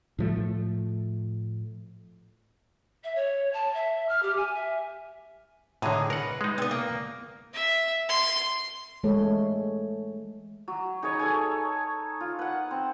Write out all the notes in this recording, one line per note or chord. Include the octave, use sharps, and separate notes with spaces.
A2 F3 A3
E5
C#5
A5
E5
F6
G4
G#5
E5
A2 D3 C#4 D#4 G#4
A#4 B4 F#5
G#3 D#4
B3 C4
A#3
E5
C6
E3 G#3 A3 G#4 A4 C#5
F#3
D#4 G#4 B4 C#5
A4 C#5 G#5
F4
B4 F#5
C4